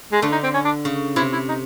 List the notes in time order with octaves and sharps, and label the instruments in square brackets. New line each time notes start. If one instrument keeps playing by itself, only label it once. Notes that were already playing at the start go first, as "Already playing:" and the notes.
[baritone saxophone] G#3
[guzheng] D3 [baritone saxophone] A3
[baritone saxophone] D#4
C4
C#4
D4
[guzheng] C#3
[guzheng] C3 [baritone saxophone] E4
[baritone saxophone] E4
D#4